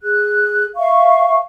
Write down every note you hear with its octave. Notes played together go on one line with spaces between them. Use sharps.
G#4 F#6
E5 F5 C#6